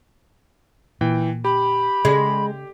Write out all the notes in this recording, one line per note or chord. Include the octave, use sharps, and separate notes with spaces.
A#2 E3 G5
G4 B5
C#3 G#3